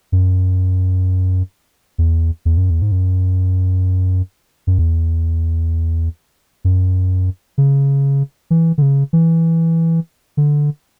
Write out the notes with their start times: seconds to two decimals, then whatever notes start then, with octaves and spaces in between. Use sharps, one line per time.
0.12 F#2
1.98 E2
2.45 E2
2.57 F#2
2.70 E2
2.82 G#2
2.92 F#2
4.67 F#2
4.78 E2
6.65 F#2
7.58 C#3
8.50 E3
8.78 D3
8.82 C#3
9.13 E3
10.37 D3